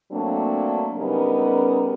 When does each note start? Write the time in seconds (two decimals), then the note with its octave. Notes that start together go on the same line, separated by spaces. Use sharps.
0.11 F#3 A3 A#3 C4 D4
0.97 C#3 G3 B3 C#4 D#4 A#4